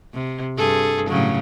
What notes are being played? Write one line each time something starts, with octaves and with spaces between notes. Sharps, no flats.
C3
G2 G#4 A4
A2 C#3 F#3